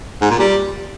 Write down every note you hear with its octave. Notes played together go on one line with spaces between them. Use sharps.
G#2
A#2
G3